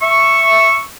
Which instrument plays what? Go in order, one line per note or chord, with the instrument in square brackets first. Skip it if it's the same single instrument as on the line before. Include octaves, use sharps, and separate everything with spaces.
[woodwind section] E5 C#6